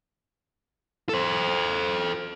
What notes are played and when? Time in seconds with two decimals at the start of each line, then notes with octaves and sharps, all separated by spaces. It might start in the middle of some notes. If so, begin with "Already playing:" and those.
1.09 A4 C5